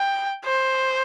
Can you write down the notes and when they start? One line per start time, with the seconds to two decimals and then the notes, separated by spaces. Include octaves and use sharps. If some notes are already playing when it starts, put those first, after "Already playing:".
Already playing: G5
0.45 C5